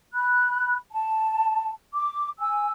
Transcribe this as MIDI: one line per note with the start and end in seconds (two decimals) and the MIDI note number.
0.14 0.76 83
0.14 0.76 90
0.92 1.69 81
1.93 2.29 86
2.39 2.71 80
2.39 2.71 88